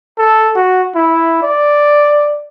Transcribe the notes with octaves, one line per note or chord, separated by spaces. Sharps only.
A4
F#4
E4
D5